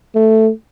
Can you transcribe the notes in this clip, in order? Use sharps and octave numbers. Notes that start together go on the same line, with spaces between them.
A3